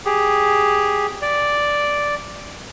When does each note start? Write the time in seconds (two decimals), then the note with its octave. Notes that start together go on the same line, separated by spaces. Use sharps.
0.05 G4 G#4
1.22 D5